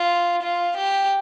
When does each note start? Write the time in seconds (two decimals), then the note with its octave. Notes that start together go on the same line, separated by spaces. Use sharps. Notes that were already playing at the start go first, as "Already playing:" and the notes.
Already playing: F4
0.42 F4
0.77 G4